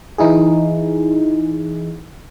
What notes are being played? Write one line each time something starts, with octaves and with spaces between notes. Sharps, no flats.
E3 D#4 E4 G#4